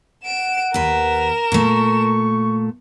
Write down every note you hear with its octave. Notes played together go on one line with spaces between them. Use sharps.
F#5 D7 E7
D#2 A#4 B4 E7
A#2 A3 C#6